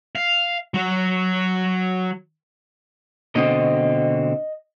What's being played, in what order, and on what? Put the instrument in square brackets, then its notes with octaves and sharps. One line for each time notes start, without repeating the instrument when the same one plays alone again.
[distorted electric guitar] F5
F#3 F#4
[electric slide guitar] B2 D3 C4 [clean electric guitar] D#5